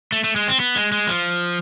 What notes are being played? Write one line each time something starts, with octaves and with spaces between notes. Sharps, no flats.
A3
A3
G#3
C4
B3
G#3
G#3
F3